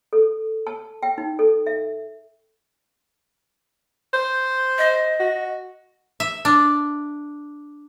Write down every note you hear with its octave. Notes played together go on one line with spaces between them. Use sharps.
A4
A5
G5
D#4
A4
E5
C5
D#5
F#4
E5
D4